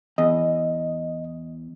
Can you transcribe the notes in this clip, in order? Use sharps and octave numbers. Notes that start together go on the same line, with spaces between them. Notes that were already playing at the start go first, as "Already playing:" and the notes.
E2 D#5